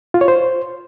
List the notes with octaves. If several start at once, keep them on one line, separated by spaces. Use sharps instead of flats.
F4
C#5
C5